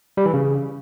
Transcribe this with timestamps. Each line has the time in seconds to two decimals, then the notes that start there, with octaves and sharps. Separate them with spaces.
0.17 G3
0.25 E3
0.34 C#3